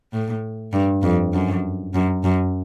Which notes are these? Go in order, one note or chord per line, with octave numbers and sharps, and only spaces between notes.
A2
G2
F2
F#2
F#2
F#2